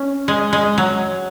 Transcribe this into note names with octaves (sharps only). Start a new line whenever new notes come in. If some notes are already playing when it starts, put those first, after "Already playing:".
Already playing: C#4
G#3
G#3
F#3